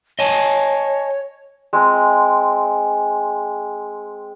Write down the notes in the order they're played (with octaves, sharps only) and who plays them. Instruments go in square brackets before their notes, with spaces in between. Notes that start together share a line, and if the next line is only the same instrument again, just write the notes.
[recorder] C#5 [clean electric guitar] D#5 G#5 A5
[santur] G#3 C4 A#5